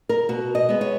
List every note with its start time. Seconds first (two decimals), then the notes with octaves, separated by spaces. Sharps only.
0.09 A#4
0.29 B2 F#4
0.55 D#5
0.69 G#3 B3
0.81 C#5